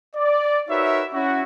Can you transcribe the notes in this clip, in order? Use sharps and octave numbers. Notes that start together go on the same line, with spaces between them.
D5
D#4 F#4 A#4 B4 C#5 E5
C#4 E4 F#4